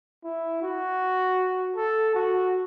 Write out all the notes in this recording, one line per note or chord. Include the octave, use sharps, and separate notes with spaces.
E4
F#4
A4
F#4